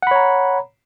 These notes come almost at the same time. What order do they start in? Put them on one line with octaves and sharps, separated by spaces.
F#5 B5 C#5 A#5